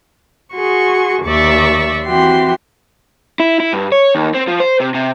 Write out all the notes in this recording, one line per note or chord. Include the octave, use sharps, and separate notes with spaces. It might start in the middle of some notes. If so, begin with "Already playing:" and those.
F#4 G#4 C6 C#6
D#2 D5 E5 C#6
E3 C4 F#4 G4 C6
E4
E4
G2
C#5
D#2
C4
F3
C5
C3
C3